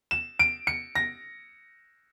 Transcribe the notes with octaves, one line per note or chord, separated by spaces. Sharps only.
E7
D7
C#7
A#6